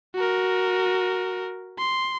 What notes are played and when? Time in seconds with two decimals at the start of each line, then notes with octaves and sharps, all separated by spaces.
0.15 F#4 A#4
1.78 C6